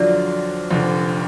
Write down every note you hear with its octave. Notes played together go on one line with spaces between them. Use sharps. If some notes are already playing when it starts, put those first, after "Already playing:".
Already playing: F2 D3 F#3 D4 F4 D5
F1 F2 D3